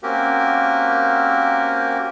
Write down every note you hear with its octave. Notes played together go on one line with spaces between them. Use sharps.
A#3 C4 C#4 F#4 G4 A#4